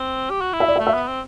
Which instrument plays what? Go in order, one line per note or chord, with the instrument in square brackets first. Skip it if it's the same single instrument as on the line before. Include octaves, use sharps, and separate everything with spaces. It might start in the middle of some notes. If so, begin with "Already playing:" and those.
Already playing: [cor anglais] C4
G4
F#4
E4
[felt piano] E5
D5
E5
[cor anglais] A3
[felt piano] E5
[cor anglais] B3
C4